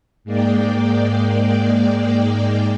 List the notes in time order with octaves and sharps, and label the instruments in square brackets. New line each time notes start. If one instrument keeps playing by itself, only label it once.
[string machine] G#2 G#3 A#3 D5 G5